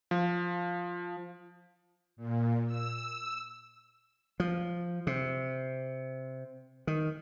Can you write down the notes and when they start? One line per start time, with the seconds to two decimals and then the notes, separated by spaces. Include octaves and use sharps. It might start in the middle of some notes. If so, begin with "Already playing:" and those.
0.11 F3
2.16 A#2
2.66 E6
4.40 F3
5.07 C3
6.87 D#3